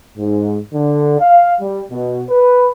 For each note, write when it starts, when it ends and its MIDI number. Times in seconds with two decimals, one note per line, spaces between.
0.17 0.59 44
0.73 1.16 50
1.20 1.54 77
1.61 1.83 55
1.91 2.22 47
2.29 2.68 71